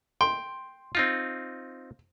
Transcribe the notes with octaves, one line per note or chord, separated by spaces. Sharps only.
G5 C6
C4 D#4 F4